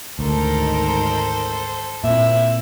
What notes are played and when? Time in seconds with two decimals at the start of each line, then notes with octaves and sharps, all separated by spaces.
0.19 G#1 D2 D#3 A4 A#4 C5
2.04 A#2 C4 E4 E5